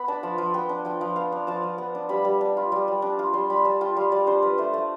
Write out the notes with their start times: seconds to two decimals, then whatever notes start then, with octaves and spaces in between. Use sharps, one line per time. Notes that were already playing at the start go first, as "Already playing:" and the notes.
Already playing: B3 B5
0.08 D4 A5
0.23 F3 A5
0.38 F3
0.54 B3 G5
0.69 D4
0.85 F3 G5
1.01 F3
1.16 B3 F5
1.32 D4
1.47 F3 A5
1.63 F3
1.78 B3
1.95 D4
2.09 G3 B5
2.25 G3
2.41 D4
2.57 F4
2.72 G3
2.88 G3
3.02 D4
3.19 F4
3.33 G3 C6
3.50 G3 B5
3.65 D4 A5
3.81 F4 G5
3.96 G3 F5
4.12 G3 D5
4.27 D4 C5
4.42 F4 B4
4.58 A3 C5
4.73 A3 C5